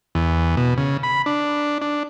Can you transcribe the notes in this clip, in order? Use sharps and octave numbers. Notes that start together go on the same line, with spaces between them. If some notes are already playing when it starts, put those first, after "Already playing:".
E2
B2
C#3
B5
D4
D4